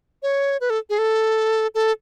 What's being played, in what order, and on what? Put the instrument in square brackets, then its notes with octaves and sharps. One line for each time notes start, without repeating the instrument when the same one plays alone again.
[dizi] C#5
B4
A4
G#4
A4
A4